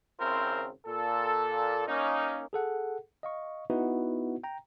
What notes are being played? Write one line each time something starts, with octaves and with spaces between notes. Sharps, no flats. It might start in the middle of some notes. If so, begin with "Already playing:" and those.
G#1 C#3 C4 E4 A#4 C5
A#2 A4
A#3 C#4 D#4
G#4 A4 F#5
D#5 F5 C#6
B3 D#4 E4 F#4 B4
G5 A#5